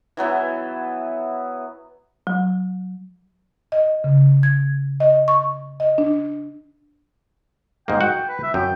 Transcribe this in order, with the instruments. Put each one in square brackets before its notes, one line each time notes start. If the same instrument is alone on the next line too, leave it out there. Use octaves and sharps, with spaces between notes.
[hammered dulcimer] E3 F#3 B3 E4
[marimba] F#3
D#5
C#3
G#6
D#5
C#6
D#5
D4
[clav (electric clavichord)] G#2 A#3 [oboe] G5
[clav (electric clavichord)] F#4 F#5
[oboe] B4
E5
[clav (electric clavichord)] F#2 [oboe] G5